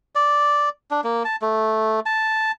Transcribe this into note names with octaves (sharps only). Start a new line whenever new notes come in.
D5
D4
A#3
A5
A3
A5